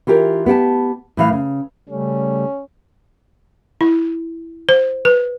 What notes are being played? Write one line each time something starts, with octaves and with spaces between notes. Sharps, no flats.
E3 F4 G4 A#4
B3 G4 F#5 A5
A2 E3 F5
C#3
C#3 G3 A3 C#4
E4
C5
B4